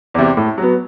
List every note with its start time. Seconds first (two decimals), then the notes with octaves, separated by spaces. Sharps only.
0.14 E2 C3
0.37 A2
0.58 F#3 B3